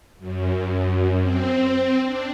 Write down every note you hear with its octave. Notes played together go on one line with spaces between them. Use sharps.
F#2
C4
D4